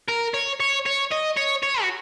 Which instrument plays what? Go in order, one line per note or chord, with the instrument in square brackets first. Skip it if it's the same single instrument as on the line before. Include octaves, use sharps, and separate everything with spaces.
[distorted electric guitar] A#4
C#5
C#5
C#5
D#5
C#5
C#5
F#4